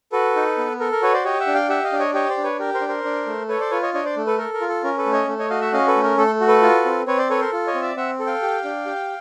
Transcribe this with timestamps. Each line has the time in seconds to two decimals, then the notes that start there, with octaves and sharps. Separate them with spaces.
0.12 F#4 A4 B4
0.36 D#4
0.58 B3
0.80 A4 A#4
0.92 A#4
1.02 F#4 B4 C#5
1.14 C5 D5
1.25 G4 C#5 D#5
1.40 E5 F#5
1.47 D4
1.54 F5 G5
1.69 G4 E5 F#5
1.84 D#5 F5
1.92 D4
1.99 C#5 D#5
2.14 G4 C#5 D#5
2.29 C5 D5
2.37 D4
2.44 B4 C#5
2.59 G4 A#4
2.74 A#4 C5
2.81 D4
2.89 A#4 C5
3.04 D4
3.27 A3
3.49 A4 B4 C#5
3.60 C5 D5
3.71 F4 B4 C#5
3.82 C#5 D#5
3.94 D4 C#5 D#5
4.05 C5 D5
4.17 A3
4.27 A4 B4
4.38 A4 A#4
4.54 A#4
4.61 F4
4.68 A4
4.84 C#4 A#4
4.98 A4 B4
5.06 A3
5.13 C#5 D#5
5.27 A3
5.39 C#5 D#5
5.50 F#4 D#5 F5
5.61 E5 F#5
5.73 C#4 D#5 F5
5.87 A4 B4
5.96 A3
6.03 A#4
6.17 A3 A4
6.40 F#4
6.48 A4 B4
6.62 F4
6.85 C4
7.07 C4 B4 C#5
7.18 C5 D5
7.30 A4 B4 C#5
7.40 A#4 C5
7.53 F4
7.67 C#5 D#5
7.74 C4
7.82 D5 E5
7.96 C4 E5 F#5
8.20 A4
8.26 F5 G5
8.42 G4
8.64 D4
8.86 G4